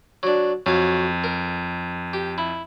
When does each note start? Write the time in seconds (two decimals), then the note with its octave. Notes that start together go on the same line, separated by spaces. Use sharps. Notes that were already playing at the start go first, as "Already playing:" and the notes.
0.23 F#3 D4
0.66 F2 F#3 F5
1.24 A#4
2.13 G4
2.38 E4